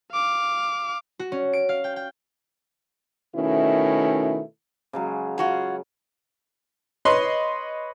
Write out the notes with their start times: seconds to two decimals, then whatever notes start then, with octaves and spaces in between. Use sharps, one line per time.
0.12 F5 D6
1.19 F#4
1.32 C#4
1.53 D7
1.69 F5
1.84 G5
1.96 G5
3.36 B2 D#3 A3 C#4 E4
4.93 C#3 F#3 G#3
5.38 F4 F#4 G#4
7.05 B4 C#5 D#5 B5 C6